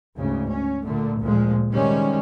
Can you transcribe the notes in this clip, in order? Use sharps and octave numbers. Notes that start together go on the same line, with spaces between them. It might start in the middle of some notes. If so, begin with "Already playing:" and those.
D2 G#2 C#3
C#4
A#2 D3 A3
D2 A#2 F3 G#3
C3 D#3 G3 G#3 C#4